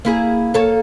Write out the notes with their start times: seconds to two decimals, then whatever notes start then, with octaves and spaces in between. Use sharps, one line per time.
0.05 A#3 E4 G#4
0.54 A#3 A4 C#5